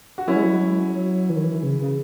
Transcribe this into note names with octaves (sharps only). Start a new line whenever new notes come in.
F#4
F#3 C#4 E4
G#3
F#3
F#3
E3
D#3
E3
C#3
C#3